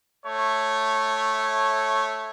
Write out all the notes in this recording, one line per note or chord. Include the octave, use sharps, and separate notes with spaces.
A3 C#5